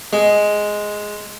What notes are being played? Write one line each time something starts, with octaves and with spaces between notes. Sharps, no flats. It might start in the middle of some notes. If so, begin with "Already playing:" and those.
G#3